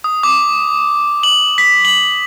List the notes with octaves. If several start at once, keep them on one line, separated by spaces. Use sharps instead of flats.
D#6
D6
F#7
B6
F#7